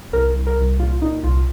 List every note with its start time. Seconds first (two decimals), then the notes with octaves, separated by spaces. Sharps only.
0.13 C2 A#4
0.35 C2
0.47 A#4
0.58 C2
0.79 A#2 F4
1.01 A#2 D#4
1.23 C2 F4